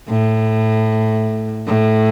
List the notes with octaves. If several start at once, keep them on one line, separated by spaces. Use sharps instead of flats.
A2
A2